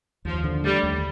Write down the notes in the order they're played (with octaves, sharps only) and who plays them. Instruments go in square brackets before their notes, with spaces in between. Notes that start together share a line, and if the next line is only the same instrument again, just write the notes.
[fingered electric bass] D#2 [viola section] F3
[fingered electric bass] D3
[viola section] G3 [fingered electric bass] A3
[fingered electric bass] D#2